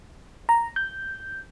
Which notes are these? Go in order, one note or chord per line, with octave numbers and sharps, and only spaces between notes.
A#5
G6